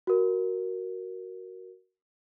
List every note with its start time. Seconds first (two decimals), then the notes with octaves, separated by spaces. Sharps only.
0.07 F#4 A#4